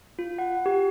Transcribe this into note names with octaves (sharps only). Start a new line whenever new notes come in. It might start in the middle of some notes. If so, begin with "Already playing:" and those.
F4
F#5
G4